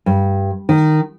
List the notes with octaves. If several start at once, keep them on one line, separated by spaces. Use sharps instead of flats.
G2
D#3